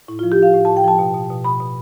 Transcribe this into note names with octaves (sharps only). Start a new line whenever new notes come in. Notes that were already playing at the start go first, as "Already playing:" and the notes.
A2 E4
F3 F4
G4
F3 F5
A2
A2 A5
G5
F3 A5
B2
B2
B2
B2 B5
B2